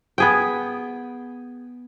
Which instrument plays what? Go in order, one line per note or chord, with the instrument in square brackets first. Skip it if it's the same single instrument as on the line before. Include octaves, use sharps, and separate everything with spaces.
[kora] B3 G#4 G5